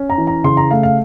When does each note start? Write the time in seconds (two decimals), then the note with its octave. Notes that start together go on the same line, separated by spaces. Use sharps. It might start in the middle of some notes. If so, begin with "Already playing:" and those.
Already playing: C#4
0.10 A#5
0.18 E3
0.27 A#5
0.44 C#3 C6
0.57 A#5
0.71 A3 F5
0.83 F5